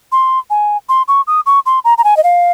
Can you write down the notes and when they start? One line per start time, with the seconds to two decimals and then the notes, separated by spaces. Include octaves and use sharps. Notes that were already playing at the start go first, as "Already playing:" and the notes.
0.12 C6
0.50 G#5
0.89 C6
1.08 C#6
1.27 D#6
1.46 C#6
1.66 C6
1.85 A#5
1.98 A#5
2.04 G#5
2.17 D#5
2.24 F5